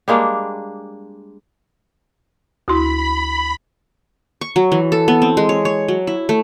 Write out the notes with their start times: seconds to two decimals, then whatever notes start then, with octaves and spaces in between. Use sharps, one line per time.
0.08 G3 G#3 A#3 D4
2.68 D2 E4 F#4 B5 C6
4.41 C#6
4.56 F#3
4.72 E3
4.92 A4
5.08 B3
5.22 C4
5.37 G#3
5.49 C#5
5.65 C#5
5.88 F#3
6.07 E4
6.29 A3